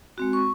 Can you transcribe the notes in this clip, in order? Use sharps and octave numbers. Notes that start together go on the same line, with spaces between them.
G#3 C4 F#4
C#6